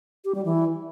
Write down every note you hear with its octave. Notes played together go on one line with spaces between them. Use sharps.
G4
G3
E3